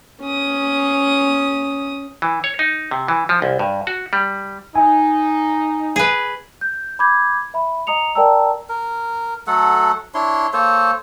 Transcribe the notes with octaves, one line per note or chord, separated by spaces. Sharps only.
C#4 D#6
E3
C#5
D#4
C3
E3
F3
C2
G2
F#4
G3
D#4 G#5
G#4 B4
G6
B5 D6 G6 G#6
E5 B5
D#5 A#5 D#6 C#7 F7
A#4 D5 G5 A5 A#5 E6
A#4
F#3 A3 A4 F#5
D4 E4 C#5 C6
A#3 A4 C5 C#5